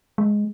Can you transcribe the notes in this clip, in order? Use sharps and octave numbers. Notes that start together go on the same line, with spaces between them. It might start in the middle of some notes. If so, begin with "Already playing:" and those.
G#3